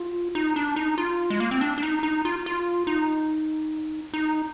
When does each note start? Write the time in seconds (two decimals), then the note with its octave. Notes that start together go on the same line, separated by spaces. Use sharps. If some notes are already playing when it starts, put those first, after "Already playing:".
Already playing: F4
0.35 D#4
0.56 D4
0.76 D#4
0.98 F4
1.30 G#3
1.40 A#3
1.51 C4
1.61 D4
1.78 D4
1.83 D#4
2.03 D#4
2.25 F4
2.46 F4
2.87 D#4
4.14 D#4